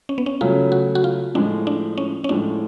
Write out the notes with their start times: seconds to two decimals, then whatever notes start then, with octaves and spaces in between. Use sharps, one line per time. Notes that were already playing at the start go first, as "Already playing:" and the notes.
0.09 C#4
0.18 B3
0.26 C#4
0.41 C#3 F#3 A3 C#4 F4
0.72 F#4
0.95 F#4
1.04 F4
1.34 A2 F3 G#3 D4
1.67 D4
1.98 C#4
2.24 C#4
2.29 A2 F3 G#3 D4